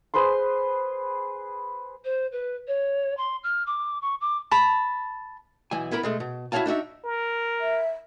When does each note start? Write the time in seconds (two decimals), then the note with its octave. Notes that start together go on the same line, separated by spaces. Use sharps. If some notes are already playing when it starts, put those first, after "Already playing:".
0.14 G#4 B4 C5 C6
2.05 C5
2.32 B4
2.68 C#5
3.17 C6
3.44 F6
3.67 D6
4.02 C#6
4.21 D6
4.51 A5 B5
5.71 B1 E3 E4 G#5
5.91 B3 E4 A#4 B5
6.03 B2 G#3 A3
6.20 B2
6.52 E4 F#4 A#4 C#5 F5 A5
6.66 D4 D#4 F#4 E5
7.04 A#4
7.60 E5